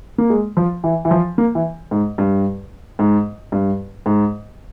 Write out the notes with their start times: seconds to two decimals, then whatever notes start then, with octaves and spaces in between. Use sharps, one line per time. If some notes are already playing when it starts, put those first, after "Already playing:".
0.18 A#3
0.30 G#3
0.57 F3
0.84 E3
1.05 E3
1.11 F3
1.38 A#3
1.55 E3
1.91 G#2
2.18 G2
2.99 G#2
3.52 G2
4.06 G#2